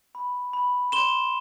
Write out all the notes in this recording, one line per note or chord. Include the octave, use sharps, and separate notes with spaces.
B5
B5
C6 E7 G7